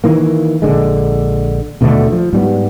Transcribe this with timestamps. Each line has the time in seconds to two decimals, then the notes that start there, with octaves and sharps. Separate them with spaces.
0.04 D#3 E3 A#3
0.62 A#1 D3 G#3
1.81 D#2 B2 D3 A3
2.12 F3
2.33 G#2 G3 B3